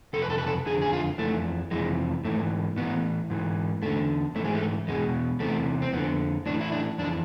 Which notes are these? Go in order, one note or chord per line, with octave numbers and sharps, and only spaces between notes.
F2 C3 A4
B4
A4
B4
A4
F2 D3 G#4
G#4
F4
F2 E3 A3
F2 C3 E3 G#3
G#2 E3 A3
A2 E3 B3
G#2 E3
E2 D3 A3
G#2 E3 G#3 A3
A3
E2 B2 G#3
E2 C3 E3 A3
C4
F2 D3 B3
A2 E3 D4
E4
D4
F2 E3 D4